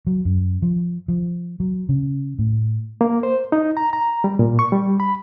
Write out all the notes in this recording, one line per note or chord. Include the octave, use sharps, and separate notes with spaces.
F#3
F#2
F3
F3
F#3
C#3
A2
A#3
C5
D#4
A#5
A#5
G3
A#2
C#6
G3
B5